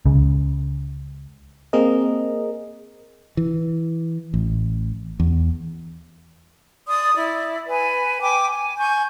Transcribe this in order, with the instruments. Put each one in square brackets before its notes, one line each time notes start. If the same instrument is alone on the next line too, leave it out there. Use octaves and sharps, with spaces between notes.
[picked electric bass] C#2 C#3
[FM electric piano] A#3 C4 G#4 A#4 D#5
[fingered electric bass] E3
A1
E2
[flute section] D5 C6 D#6
E4 D5
B4 G#5
G5 G#5 D6
G#5
G#5 C#6 G6